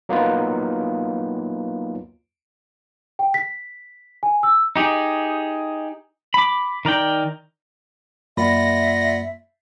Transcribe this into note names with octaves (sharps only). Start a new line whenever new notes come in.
F#3 A#3 B3 D#4 F4 B4
G5
B6
G#5
E6
D#4 G4 G#4
B5 D6
D#3 A#4 D5 G5
F#2 A#3 F4 D5 E5 F#5 B5 A#6